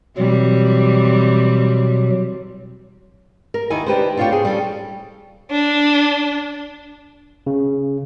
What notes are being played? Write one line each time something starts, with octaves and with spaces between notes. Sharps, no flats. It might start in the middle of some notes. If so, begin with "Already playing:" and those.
B2 E3 F#3 G3 C4
A#4
D#2 D#3 D#4 E4 G#5
D4 G4 B4 C5
A2 D4 F4 A#4 C#5 G5
G#4 C5
G3 C#4 A4
D4
C#3